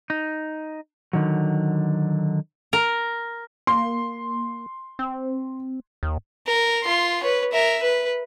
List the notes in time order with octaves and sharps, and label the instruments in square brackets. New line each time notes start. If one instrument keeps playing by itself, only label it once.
[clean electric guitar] D#4
D3 D#3 F#3
[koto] A#4
[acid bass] A#3 [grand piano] C6
[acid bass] C4
D#2
[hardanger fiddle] A#4
F4 C6
B4 C#5
A#4 E5
B4